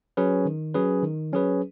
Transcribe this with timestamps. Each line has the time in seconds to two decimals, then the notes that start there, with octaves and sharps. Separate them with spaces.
0.17 F#3 C#4 G#4 B4
0.46 D#3
0.74 F#3 C#4 G#4 B4
1.03 D#3
1.32 F#3 C#4 G#4 B4